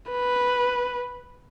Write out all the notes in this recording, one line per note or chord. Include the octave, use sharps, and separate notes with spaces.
B4